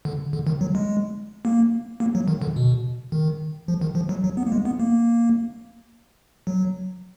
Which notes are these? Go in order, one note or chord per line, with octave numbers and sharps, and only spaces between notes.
D3
D3
D#3
F#3
G#3
A#3
A#3
F#3
D#3
D3
B2
D#3
F3
D#3
F3
F#3
F#3
B3
A#3
G#3
B3
A#3
F#3